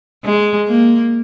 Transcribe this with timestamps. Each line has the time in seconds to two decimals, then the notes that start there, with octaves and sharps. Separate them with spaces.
0.25 G#3
0.69 A#3